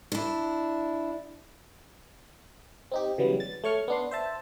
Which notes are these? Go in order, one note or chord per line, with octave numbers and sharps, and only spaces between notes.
D4 E4
C4 D#4 G4
C#3 E3 F#3 G3 B3
A6
A3 C#5 C#6 F6
B3 D4 C6
C5 E5 A5